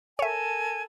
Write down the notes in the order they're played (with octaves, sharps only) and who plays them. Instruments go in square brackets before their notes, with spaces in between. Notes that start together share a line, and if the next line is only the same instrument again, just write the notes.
[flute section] A4 A#4 G#5 [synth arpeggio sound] C#5 E5